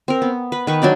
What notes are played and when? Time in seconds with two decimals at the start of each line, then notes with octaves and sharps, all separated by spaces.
0.08 C4 A#4
0.22 B3
0.52 B4
0.67 D#3 B4 C#6
0.82 F#3 D4 D#4 D5